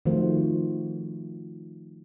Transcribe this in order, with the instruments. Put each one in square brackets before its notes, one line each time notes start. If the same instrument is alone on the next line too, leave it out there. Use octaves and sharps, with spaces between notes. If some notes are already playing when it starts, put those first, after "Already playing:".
[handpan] D#3 F3 A3 F#4 C5